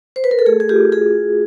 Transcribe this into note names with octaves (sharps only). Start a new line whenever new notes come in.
C5
B4
A#4
A4
A3 G#4
G#4
F4 G4
F#4 G#4